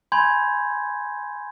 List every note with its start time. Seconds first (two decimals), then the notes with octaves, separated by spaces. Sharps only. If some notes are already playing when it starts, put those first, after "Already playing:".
0.12 G#5 B5 C6 G6 G#6